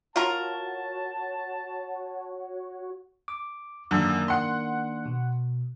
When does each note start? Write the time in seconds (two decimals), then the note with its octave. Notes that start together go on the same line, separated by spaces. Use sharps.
0.16 F4 F#4 A#4 C#5 A5
3.28 D6
3.91 F#2 D3 D#3 A#3 D4
4.28 F#5 C6
5.06 B2